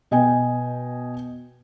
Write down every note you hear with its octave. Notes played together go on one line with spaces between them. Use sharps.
B2 D#5 G5 G#5